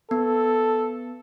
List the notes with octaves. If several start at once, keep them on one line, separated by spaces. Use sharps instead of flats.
B3 A4